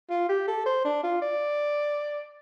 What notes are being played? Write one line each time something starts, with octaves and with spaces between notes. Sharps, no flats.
F4
G4
A4
C5
D4
F4
D5